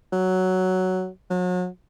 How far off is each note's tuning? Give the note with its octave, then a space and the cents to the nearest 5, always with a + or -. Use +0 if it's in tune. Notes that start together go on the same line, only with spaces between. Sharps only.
F#3 +5
F#3 -35